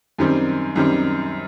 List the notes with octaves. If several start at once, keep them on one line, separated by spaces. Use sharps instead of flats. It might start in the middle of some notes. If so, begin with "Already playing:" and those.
F#2 D#3 G3 C4
F#2 D#3 G3 C4